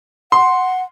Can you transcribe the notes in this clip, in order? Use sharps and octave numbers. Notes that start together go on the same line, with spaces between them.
F#5 C6